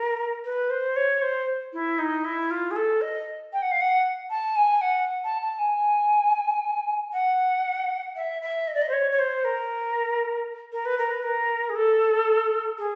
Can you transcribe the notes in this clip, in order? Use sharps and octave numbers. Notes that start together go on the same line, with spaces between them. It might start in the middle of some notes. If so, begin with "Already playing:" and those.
Already playing: A#4
B4
C5
C#5
C5
E4
D#4
E4
F4
G#4
A4
D#5
G5
F#5
F5
F#5
A5
G#5
F#5
A5
A5
G#5
F#5
E5
E5
D#5
D5
D#5
C5
C#5
C#5
C5
A#4
A#4
B4
A#4
B4
A#4
G#4
A4
G#4